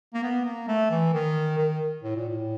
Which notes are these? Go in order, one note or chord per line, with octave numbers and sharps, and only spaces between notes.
A#3
B3
A#3
A3
E3
D#3
D#3
A2
A#2
A2